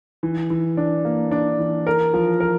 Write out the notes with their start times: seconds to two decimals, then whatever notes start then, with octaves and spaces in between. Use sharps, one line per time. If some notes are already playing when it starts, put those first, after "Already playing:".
0.23 E3
0.50 E3
0.77 D4
1.05 A#3
1.31 D4
1.59 E3
1.87 A#4
2.13 F3
2.40 A#4